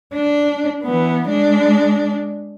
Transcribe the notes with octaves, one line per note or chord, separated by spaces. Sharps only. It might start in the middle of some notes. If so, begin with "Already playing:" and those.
D4
E3 B3
G#3 D4